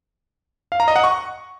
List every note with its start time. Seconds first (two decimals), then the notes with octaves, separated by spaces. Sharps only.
0.72 F5
0.80 A#5
0.88 D#5
0.96 F#5
1.04 C#6